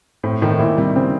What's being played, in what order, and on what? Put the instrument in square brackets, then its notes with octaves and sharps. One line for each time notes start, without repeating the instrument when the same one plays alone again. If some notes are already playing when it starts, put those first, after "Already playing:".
[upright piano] A2 [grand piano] C4
[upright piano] A2 [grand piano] D#3
[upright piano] A#2 [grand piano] E4
[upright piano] C3 [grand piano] G3
[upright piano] C#3 [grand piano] C4